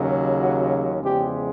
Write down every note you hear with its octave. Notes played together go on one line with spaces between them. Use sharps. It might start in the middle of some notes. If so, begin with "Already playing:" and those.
Already playing: D#2 C#3 F#3
F#4
E2 C#3 F3 G#3 G4